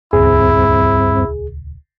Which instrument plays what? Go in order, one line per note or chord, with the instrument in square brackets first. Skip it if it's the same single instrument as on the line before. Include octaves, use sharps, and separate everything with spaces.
[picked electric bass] D#1 C#2 [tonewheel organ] G2 C4 [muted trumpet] E4 [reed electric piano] G#4